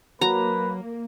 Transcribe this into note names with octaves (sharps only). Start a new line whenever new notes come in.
F#3 A#3 B4 A#5